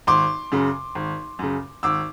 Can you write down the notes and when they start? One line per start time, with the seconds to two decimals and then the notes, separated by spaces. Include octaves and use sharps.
0.07 G#1 C6 D6
0.52 F#2 C#3
0.95 G#1
1.39 F#2 C#3
1.83 G#1 D6 E6